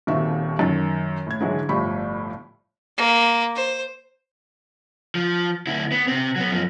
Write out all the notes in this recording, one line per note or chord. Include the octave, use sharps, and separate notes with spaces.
D#1 D#2 D#3 C4 F#4 E5
F#2 D#3 A6
A2 G#6
G#2 D3 E3 F#3 G#3
G1 A2 F3 G4 B5 C#6
A#3
C5
F3
D2 E4
B3
C3 C4
F#3 B3
F#2 F3